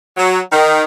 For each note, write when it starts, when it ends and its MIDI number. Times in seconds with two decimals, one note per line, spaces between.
0.17 0.39 54
0.52 0.83 51